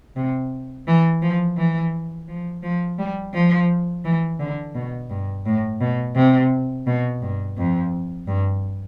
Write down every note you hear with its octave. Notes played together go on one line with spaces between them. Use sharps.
C3
E3
F3
E3
F3
F3
G3
F3
E3
D3
B2
G2
A2
B2
C3
B2
G2
F2
G2